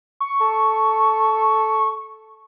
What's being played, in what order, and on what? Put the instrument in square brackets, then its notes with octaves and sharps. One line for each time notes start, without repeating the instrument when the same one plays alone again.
[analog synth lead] C#6
[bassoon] A4